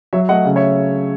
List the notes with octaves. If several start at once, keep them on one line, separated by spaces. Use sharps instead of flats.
F#3 C#5 E5
A3 D#5 F#5
C#3
C#5 E5